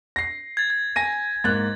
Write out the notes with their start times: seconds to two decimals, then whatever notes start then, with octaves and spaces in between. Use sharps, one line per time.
0.16 A#6 C7
0.57 G#6 A6
0.70 G#6
0.96 G#5 A#6 D#7
1.44 G#2 A#3 F#6 A6